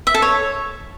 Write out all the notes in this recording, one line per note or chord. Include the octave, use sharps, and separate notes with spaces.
E5
A4
C#5